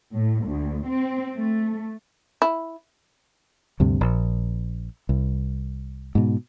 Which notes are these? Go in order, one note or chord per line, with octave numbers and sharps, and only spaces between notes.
A2
D2
C4
A3
E4
D2 G2 C3
A#1
C2
G#2 B2